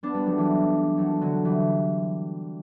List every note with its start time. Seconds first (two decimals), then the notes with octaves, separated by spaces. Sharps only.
0.03 B3 D4
0.14 G3 B3
0.26 F#3 A3
0.38 E3 G3
0.97 F#3 A3
1.21 D3 F#3
1.45 E3 G3